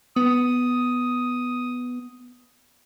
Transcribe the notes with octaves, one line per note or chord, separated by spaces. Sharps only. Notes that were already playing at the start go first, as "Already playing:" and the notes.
B3 D#6